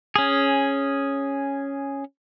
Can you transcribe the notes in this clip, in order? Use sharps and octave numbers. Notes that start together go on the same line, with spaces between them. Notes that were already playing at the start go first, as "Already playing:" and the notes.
C#4 G#4